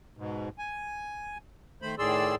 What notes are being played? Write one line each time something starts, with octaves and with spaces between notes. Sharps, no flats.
G#2 B2
G#5
D#3 A3 C5 B5
A2 D#3 G#4 D5 C6 E6